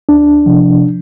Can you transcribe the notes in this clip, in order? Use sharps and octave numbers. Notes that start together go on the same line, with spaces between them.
D2 D4
C3 F3